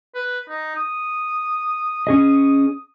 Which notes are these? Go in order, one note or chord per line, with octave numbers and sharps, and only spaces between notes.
B4
D#4
D#6
C#4 G#4 D#5